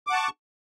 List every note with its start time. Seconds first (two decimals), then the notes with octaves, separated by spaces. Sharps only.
0.07 D6
0.10 F#5
0.12 A5
0.15 C#6